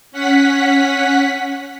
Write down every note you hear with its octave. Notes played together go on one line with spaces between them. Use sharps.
C#4 F#5 B6